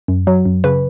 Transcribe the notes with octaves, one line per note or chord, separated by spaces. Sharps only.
F#2
F#3
F#2
C#3 B4